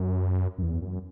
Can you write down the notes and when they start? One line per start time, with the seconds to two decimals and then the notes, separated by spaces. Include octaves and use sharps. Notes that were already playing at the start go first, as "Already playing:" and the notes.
Already playing: F#2
0.58 F#2
0.62 E2
0.82 F#2